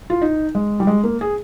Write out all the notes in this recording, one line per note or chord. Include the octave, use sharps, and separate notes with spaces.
F4
D#4
G#3
G3
G#3
A#3
G#4